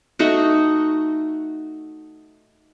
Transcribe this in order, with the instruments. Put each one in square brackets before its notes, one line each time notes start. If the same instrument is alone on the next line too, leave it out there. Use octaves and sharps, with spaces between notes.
[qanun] A3 D#4 F#4